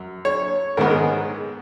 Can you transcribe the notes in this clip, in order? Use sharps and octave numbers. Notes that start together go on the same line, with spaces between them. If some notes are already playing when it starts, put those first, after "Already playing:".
Already playing: F#2
C#5
G#2 D#3 G#3 B3 A#4
G#4